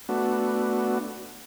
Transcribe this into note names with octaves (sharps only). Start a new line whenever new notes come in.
A3 B3 D4 F#4